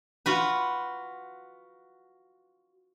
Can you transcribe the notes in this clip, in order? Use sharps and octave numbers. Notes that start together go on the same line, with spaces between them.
F4 F#4 B4